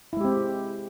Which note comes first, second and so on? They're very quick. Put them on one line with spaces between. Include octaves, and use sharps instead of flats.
E4 G#3 G4 C4